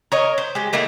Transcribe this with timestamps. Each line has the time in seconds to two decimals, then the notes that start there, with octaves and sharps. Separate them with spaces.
0.12 A#4 C#5 D#5
0.38 C5
0.55 G#3 G4
0.73 A3 A#3 D#4 E4